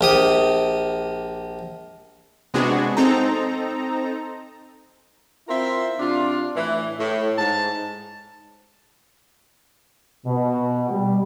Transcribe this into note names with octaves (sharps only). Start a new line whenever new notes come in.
A#1 G4 D#6
C3 G#3 B3 D4 F#4 G#4
C4 D#4 A4 A#5
C4 E4 F4 A#4 C5 E5
C3 D4 F4
A2 E3
A2
G#2 A5
B2
G3